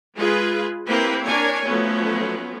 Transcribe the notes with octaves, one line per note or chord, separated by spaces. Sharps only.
G#3 F4 G#4 B4
A#3 C4 E4 G4 A#4 B4
D4 A#4 C#5 G#5
F3 F#3 A3 B3 C#4